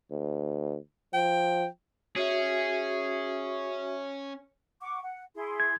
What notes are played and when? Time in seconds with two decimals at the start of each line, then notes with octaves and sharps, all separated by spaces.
0.11 D2
1.14 F3 G5
2.16 C#4 F#4 G#4 E5
4.80 F#5 C#6 D6
5.03 F#5
5.35 E4 G#4 C6
5.60 G#6